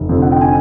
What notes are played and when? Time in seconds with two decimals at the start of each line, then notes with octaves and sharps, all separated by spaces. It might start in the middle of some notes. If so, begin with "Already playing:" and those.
Already playing: F1
0.09 F2 D3
0.22 F#5
0.32 G5
0.41 G#5